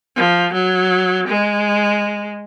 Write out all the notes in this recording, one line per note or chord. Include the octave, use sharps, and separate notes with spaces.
F3
F#3
G#3